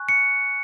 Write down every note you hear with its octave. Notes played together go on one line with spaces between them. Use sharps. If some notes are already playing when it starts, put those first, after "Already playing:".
Already playing: G#5 C#6 F#6
C#7